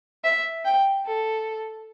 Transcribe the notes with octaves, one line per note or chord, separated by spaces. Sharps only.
E5
G5
A4